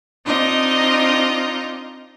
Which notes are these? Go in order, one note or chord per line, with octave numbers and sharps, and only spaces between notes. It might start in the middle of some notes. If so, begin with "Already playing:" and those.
C4 D4 D#4 F4 D#5